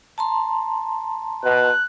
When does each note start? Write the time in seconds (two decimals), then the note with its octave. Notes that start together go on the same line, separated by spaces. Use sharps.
0.18 A5 A#5 C6
1.44 B2 F#6